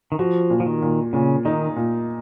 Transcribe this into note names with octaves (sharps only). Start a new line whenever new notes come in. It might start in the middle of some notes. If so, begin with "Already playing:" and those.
D#3
F3 F#4
A#2
F3
D#3
A#2
A#2 C#3
D#3 D#4
A#2